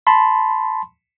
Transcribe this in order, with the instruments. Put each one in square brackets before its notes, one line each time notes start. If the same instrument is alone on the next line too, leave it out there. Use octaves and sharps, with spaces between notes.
[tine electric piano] A5 B5 C6